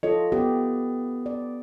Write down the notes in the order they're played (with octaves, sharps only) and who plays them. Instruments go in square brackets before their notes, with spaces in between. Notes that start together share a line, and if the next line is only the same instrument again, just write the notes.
[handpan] F4 A4 D#5 [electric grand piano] C#5
[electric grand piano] B3 [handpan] G4
[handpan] D5